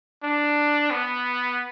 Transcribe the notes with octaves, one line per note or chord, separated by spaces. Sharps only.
D4
B3